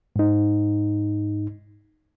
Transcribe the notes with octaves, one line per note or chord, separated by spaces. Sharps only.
G#2 D#4